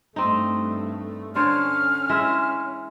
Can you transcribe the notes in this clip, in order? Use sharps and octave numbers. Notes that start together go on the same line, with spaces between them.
G2 A3 C4 D#4
D3 C#4 C5 C#5 F6
E3 G#3 E5